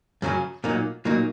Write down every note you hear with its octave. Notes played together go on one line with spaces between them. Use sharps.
F#2 C#3 F#3 C#4
A#2 F#3 A#3 D#4
A#2 F#3 A#3 D#4